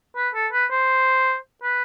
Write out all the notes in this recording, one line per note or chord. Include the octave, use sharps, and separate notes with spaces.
B4
A4
B4
C5
B4